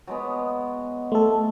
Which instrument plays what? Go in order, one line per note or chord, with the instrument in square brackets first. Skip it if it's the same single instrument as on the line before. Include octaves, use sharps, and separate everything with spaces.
[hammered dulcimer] F#3 G#3 B3
[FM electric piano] A3 A4 [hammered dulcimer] C6